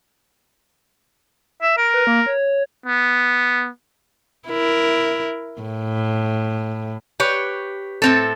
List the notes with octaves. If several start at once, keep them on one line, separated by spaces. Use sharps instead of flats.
E5
A#4 D7
B4
A#3
C#5
B3
E4 A#4
A2
G4 B4 C#5
A2 C4 A4